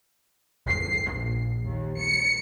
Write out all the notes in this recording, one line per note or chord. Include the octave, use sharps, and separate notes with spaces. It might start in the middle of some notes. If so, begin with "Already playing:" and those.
C7
A#1
D#2
C#7